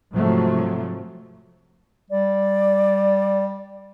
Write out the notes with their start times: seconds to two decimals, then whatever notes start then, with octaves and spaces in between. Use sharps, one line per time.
0.11 G#2 C3 F3 F#3 A3
2.10 G3 D5